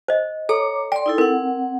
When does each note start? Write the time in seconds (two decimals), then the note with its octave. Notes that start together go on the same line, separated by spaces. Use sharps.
0.08 C5 D#5
0.49 A4 C#5 A#5 D6
0.92 D5 G5 C6
1.06 D#4 E4 A4
1.18 C4 A#4 F#5